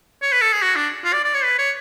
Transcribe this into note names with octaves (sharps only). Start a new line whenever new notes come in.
C#5
B4
A4
G#4
F#4
D4
F4
D5
D5
C#5
B4
C#5